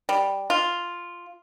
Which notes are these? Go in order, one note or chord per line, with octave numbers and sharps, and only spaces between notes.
G3
F4